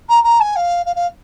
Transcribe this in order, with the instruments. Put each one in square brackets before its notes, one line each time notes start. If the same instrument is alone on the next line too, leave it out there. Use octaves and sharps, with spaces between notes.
[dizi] A#5
A#5
G#5
F5
F5
F5